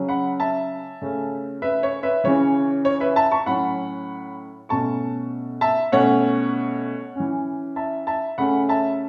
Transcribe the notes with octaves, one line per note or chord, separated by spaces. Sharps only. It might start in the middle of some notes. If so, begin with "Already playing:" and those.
Already playing: C#3 F#3 C#4
F#5 B5
E5 A5
C#3 A3 C#4
B4 E5
C#5
B4 E5
C#3 E3 C#4 C#5
C#5
B4 E5
E5 A5
A5 C#6
A2 F#3 C#4 F#5 B5
B2 A3 C#4 A5 C#6
E5 A5
B2 A3 C#4 C#5 F#5
E3 C#4
E5 A5
E5 A5
C#3 A3 C#4 F#5 B5
E5 A5